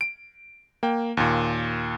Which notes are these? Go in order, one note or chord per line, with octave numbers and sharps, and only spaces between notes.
D7
A#3 G5
D#2 A#2